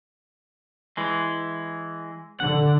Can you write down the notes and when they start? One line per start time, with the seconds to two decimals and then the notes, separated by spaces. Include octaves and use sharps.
0.97 E3 G#3
2.40 D3 F#5